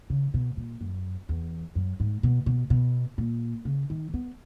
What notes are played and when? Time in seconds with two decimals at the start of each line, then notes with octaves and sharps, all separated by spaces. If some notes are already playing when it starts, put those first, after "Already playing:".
0.10 C#3
0.34 B2
0.57 A#2
0.81 F#2
1.29 E2
1.75 F#2
2.00 G#2
2.23 B2
2.46 B2
2.70 B2
3.18 A#2
3.65 C#3
3.90 D#3
4.14 B3